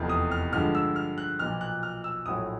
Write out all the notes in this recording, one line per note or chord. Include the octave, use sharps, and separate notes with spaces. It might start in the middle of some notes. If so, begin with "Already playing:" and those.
Already playing: F1 E2 C3 F3 A3
D#6
F6
G2 D3 F3 G#3 F6
E6
F6
F#6
B1 A#2 F3 F6
F#6
F6
E6
A#1 A2 F#3 D#6